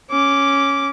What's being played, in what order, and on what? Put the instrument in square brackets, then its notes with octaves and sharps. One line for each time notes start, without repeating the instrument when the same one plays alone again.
[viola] C#4 D6